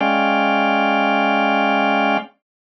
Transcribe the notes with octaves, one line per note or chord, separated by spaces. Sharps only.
G#3 C#4 D5 F5 G5